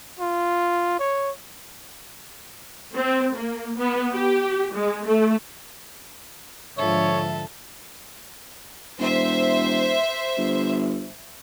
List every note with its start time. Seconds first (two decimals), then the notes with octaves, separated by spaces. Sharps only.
0.19 F4
0.99 C#5
2.95 C4
3.35 A#3
3.77 B3
4.13 G4
4.74 G#3
5.05 A3
6.78 G#2 D3 F3 F4 A4 C#5 E5
8.99 E1 C5 E5
10.38 G1